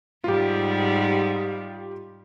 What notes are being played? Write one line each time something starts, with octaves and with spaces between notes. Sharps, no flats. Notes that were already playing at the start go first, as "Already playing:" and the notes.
G#2 G3 F4 G4